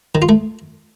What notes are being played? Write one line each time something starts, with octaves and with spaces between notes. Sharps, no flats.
D#3
F4
A3